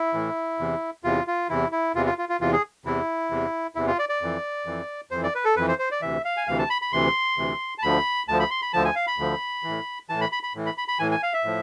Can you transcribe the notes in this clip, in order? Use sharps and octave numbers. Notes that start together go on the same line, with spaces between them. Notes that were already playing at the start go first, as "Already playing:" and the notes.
Already playing: E4
A2 E3
E2 C3 E3
E2 C3 E3 F4
F4
E2 C3 E3 E4
E4
E2 C3 E3 F4
F4
F4
F4
E2 C3 E3 F4
G#4
E2 C3 E3 E4
E2 C3 E3
E2 C3 E3 E4
F4
D5
D5
F2 E3
F2 E3
F2 E3 C5
D5
B4
A4
F2 E3 B4
C5
C5
D5
D2 C3 E3 E5
F5
G#5
D2 C3 E3 F5
A5
B5
B5
D2 C3 E3 C6
D2 C3 E3
A5
D2 D3 F3 B5
D2 D3 F3 A5
B5
C6
B5
D2 D3 F3 A5
G#5
F5
B5
D2 D3 F3
E3
A2
A2 E3 A5
B5
B5
B5
A2 E3
B5
B5
B5
A2 E3 G#5
G#5
F5
E5
A2 F3